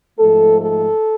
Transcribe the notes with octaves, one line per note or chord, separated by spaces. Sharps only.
G#2 F3 A3 A4
A4